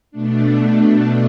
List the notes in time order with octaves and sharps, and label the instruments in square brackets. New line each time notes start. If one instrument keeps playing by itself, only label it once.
[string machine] B2 A3 D4